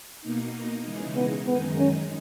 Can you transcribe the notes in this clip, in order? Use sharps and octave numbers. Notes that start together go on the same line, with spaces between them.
B2 A#3 D#4
C#3 E3 G#3 D#4
B3
F#2 D#3 G#3 B3 D#4
C#4